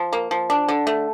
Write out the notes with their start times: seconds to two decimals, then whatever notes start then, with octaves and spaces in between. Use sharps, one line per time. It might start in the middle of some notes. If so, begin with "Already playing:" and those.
Already playing: F3
0.13 A#3
0.31 F3
0.50 D4
0.68 D3
0.87 A3